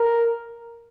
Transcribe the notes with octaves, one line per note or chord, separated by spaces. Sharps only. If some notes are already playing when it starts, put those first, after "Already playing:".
Already playing: A#4